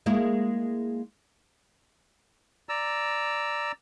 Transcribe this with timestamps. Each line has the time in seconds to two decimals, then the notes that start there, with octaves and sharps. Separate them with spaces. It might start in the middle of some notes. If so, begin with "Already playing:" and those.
0.06 G#3 A#3 E4
2.69 D5 A#5 E6